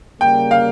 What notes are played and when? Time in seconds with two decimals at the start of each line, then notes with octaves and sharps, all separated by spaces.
0.21 C#3 G3 A#3 G5
0.51 F5